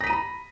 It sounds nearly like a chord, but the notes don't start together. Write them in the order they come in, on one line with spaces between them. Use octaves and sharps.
A#6 B6 D#7 A#5 B5